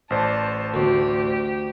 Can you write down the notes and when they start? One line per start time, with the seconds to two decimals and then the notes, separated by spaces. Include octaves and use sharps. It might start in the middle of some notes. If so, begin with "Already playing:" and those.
0.10 A1 C5 D5 A5
0.74 D2 G4